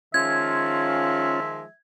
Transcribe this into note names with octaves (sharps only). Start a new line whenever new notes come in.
D#3 F3 G#3 C#4 F4 E5 G#6